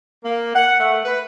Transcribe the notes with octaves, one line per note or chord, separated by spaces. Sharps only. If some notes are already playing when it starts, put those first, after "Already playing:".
A#3
F#5
A3
B4